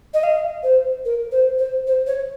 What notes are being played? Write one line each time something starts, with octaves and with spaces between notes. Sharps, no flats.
D#5
F5
C5
A#4
C5
C5
C5
C#5